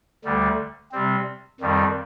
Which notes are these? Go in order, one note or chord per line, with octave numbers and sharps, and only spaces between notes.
D2 D3 G3
C3 G3 C4
F2 D#3 G3